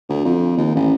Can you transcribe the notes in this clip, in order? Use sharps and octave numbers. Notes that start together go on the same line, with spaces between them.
D2
F2
D#2
A1